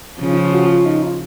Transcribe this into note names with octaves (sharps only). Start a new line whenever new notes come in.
C#3 F3 C#4
D#4
F4
F#4
F4
D#4
F4